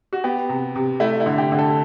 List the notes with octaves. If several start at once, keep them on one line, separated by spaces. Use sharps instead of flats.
F#4
B3 G4
C3
C3
A3 E4
E4
D3
G4
D3
A4